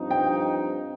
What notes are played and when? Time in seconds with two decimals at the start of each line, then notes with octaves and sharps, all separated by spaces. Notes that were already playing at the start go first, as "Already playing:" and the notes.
Already playing: G2 F3 C4 D#4
0.11 G5